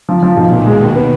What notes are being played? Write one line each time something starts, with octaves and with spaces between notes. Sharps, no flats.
F3
F3
B1 B2 D#3
A#2
G#3
D#2
B3